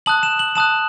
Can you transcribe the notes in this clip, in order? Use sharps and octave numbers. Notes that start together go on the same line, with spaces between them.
A5 D#6 F#6 F#7
E7
F#7
A5 D#6 F#6 E7